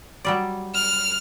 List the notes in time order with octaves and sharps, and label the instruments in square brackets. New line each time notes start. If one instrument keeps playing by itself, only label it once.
[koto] F#3 G3 D5
[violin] F6